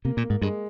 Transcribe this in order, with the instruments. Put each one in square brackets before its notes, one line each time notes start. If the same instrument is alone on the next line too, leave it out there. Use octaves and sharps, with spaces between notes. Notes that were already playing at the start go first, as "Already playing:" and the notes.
[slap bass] C3 [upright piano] A#3
[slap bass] A#2
[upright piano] A#3
[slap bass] G#2
[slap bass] G2 [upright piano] G#3